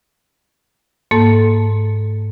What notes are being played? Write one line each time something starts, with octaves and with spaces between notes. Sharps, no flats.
G#2 A#3 A4 A5